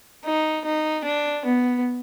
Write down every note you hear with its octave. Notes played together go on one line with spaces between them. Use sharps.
D#4
D#4
D4
B3